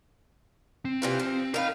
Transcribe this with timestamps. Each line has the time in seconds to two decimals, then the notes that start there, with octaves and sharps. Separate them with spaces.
0.85 C4
1.02 C3 E3 F4
1.20 F3
1.54 D#3 A#4 F5 B5